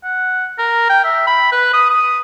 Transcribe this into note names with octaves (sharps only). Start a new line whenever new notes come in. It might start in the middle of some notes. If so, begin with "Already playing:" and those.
F#5
A#4
G5
E5
B5
B4
D#6
D#6